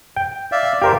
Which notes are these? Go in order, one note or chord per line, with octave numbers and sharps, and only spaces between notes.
G5
D5 E5 F5
G4 A#4 C5 F5